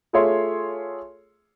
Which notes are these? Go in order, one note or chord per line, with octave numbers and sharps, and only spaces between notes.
A3 F4 G#4 C#5 E5 C6